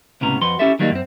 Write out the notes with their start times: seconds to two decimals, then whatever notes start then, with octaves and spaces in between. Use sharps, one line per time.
0.21 C#2 A2 C3 B3 C#4 A#5
0.41 F2 F#4 B4 C6
0.59 C#4 E4 G4 A4 E5
0.79 D#3 F#3 G3 A#3 D4 D#4
0.91 F#2 C4